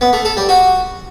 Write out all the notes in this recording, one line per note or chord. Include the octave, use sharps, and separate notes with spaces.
B3
A3
A4
G3
F#4